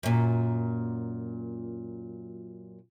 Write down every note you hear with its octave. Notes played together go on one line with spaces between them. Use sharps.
F#2 A#2